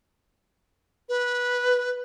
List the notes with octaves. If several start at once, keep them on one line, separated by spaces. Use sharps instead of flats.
B4